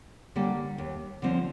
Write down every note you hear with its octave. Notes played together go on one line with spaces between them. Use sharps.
D3 G3 A#3
D#2
D3 F3 C4